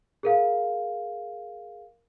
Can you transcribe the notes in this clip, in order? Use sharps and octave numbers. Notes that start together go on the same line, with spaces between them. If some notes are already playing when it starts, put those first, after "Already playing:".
G#4 A#4 F5